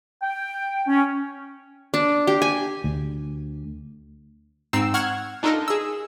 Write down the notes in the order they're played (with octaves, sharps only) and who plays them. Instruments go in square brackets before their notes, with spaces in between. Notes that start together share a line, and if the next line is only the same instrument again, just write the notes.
[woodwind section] G5
C#4
[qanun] D4
G4
G#5
[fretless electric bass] D2
[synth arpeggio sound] G#2 C4 D#4 E6 C7 E7
F#5 C#6 F6 F#6 G#6
D4 D#4 F4 A4 A#4 D#5
G#4 E6